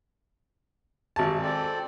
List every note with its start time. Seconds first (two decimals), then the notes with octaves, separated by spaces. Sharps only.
1.16 G#1 A5
1.42 C4 A4 D5